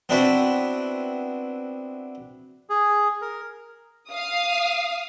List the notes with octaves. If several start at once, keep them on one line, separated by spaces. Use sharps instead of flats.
B3 C4 D4 E4 F#4 B4
G#4
A#4
F5 D#6